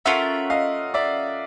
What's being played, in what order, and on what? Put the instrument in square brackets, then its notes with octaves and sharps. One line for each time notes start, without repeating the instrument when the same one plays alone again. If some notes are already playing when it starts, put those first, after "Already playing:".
[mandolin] A3 C#4 F4 A#4 [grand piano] E5 F#5
[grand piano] D#5 F5
D5 E5